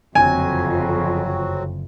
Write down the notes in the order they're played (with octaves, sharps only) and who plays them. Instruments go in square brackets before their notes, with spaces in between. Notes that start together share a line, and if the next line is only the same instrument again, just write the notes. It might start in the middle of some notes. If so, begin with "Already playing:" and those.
[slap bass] F#1 D3 E3 [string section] F2 [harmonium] F#3 C4 F#4 [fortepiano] G#5